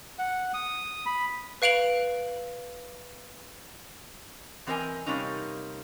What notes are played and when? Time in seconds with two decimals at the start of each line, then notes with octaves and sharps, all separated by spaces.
0.19 F#5
0.54 D#6
1.06 B5
1.62 B4 F5 D7 F7 F#7
4.67 E3 C4 A#4 C#5 D#5 G#5
5.06 C3 G3 A#3 C#4 D#4